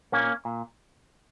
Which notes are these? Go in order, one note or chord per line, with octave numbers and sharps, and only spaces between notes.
A#2 A#3 C#4
A#2